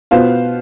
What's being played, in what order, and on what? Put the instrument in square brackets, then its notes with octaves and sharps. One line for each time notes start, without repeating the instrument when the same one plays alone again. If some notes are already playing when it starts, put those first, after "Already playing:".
[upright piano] B2 B3 F4 C5 F5